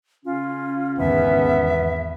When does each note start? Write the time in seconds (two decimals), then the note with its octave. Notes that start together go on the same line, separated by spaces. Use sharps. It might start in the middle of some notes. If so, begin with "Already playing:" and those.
0.25 C#3 C#4 F4
0.99 G#1 E2 B3 E5